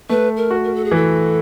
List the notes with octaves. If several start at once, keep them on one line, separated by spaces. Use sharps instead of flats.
A3 B4
A#4
F#4
A#4
A4
G#4
E3 A4